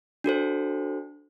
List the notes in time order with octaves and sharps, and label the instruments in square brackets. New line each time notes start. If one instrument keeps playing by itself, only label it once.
[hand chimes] D4 F#4 A4 C5